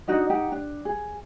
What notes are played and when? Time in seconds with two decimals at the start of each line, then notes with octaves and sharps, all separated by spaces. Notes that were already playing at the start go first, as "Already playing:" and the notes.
0.08 D4 D#4 F#4 D#5
0.30 D#4 G4 F#5
0.52 D4
0.85 G#4